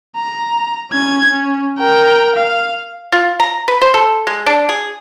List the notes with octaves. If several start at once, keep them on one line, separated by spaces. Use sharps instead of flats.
A#5
C#4 G#6
C#4
A#4 G5
F5
F4
A#5
B4
C5
A4
G#3
D4
G#4